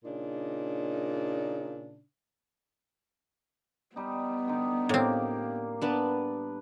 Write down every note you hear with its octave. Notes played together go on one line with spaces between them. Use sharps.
A#2 C#3 D4 D#4
G3 B3 D#4
D3 D#4
A2 A#3 C4 G4 F5
B3 D4 B4 A5